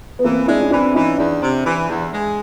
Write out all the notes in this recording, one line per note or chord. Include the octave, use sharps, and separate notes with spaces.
B3
E3 A#3 C4
G#3 D4 E4
C#4
E3 C4 D4
E3 C#4 D#4
E2 D4 E4
C3
E3
E2
G#3